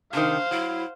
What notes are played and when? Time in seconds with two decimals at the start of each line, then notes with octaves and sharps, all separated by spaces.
0.13 C3 D#3 D4 C5 F5
0.51 F#3 E4